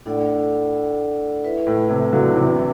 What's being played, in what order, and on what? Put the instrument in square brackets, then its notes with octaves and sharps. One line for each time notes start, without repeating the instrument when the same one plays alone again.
[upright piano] A2 [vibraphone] D4 A4 D5 F#5
[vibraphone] E4 B4 E5
[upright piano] A2
A2 C3
D3 F#3
C3 E3